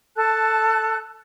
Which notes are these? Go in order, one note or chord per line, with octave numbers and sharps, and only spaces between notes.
A4 A5 F#6